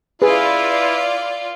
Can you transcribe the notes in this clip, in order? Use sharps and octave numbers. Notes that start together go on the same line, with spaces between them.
E4 F4 G#4 B4 D5